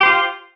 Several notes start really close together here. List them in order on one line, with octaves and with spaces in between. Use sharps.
G4 C5 F4